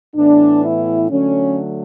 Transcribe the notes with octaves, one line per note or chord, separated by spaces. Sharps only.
A2 E3 B3 D4
E4
D3 F#3 A3 C#4